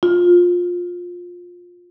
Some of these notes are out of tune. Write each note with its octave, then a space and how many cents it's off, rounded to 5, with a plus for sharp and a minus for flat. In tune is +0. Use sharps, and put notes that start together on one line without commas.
F4 +20